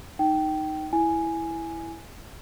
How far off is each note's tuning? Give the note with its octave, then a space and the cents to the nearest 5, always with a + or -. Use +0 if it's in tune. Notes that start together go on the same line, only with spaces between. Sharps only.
D#4 +0 G5 -15
E4 +0 G#5 +0